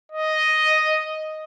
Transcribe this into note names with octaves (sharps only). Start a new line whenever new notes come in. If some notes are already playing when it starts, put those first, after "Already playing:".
D#5